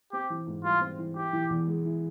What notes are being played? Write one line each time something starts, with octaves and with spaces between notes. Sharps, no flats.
C4 G4
E3
G#2
G3 F4
C4
E3
E4 G4
E3
E2
G#3
E4